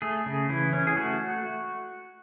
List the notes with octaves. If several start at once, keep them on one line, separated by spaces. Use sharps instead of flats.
A3 G#4
C#3
E3 E4
C#4
G#4
A3 F#4